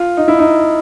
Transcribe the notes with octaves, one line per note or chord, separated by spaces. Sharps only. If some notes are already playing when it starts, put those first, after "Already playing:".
Already playing: F4
D#4
E4
D#4